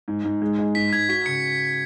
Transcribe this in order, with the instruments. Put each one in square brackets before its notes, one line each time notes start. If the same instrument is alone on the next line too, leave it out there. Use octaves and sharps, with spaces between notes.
[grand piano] G#2
G#2
G#3
G#3
[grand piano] G#2 [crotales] B6
[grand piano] G#2 [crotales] G#6
[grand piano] F#4 [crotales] B6
[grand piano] C#3 [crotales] C#7